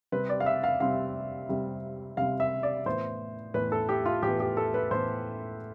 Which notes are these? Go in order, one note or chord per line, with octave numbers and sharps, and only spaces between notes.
C3 G3 C4 B4
D5
F5
E5
F5
C3 G3 C4 F5
C3 G3 C4
C3 G3 C4 F5
E5
D5
A2 E3 B3 C5
A2 E3 B3 B4
A4
G4
F4
A2 E3 B3 G4
G4
A4
B4
A2 E3 B3 C5